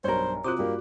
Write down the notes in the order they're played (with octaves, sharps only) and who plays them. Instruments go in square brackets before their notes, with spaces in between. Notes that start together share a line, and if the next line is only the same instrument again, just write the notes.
[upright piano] B1 G2 [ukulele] A#4 C#5 [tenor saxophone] C5
[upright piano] C3 D#6 F#6 [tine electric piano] F4 F#4 D6 [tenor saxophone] C5
[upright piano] G2 G4 [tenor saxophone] A#3